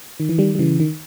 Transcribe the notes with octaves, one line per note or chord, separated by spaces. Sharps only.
D#3
E3
D#3 G3
G3
C#3 E3
D#3